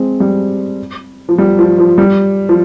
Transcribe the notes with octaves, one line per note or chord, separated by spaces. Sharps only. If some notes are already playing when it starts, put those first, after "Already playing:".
Already playing: G#3 C4
G3
F3
G3
F3
F3
G3
F3